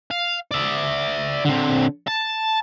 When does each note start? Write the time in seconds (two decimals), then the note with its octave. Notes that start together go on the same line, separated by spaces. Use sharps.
0.11 F5
0.51 D5 E5
1.46 D3 C4
2.07 A5